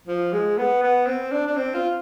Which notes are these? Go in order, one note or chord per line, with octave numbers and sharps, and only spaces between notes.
F3
G#3
B3
B3
C4
D4
D4
C4
F4